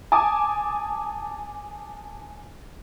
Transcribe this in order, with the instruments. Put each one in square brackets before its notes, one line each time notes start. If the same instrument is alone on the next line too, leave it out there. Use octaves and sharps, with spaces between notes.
[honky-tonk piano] G#5 A5 D6 D#6